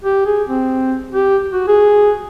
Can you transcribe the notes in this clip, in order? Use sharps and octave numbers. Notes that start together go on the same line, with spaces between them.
G4
G#4
C4
G4
F#4
G#4